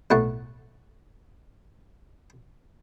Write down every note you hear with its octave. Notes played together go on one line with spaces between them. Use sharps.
B1 A2 A3 F#5